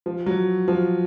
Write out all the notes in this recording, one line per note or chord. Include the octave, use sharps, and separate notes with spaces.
F3
F#3
F3